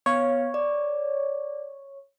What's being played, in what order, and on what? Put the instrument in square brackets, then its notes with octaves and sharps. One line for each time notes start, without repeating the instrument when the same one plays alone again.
[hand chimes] B3 F5 [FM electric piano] C#5
[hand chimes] D5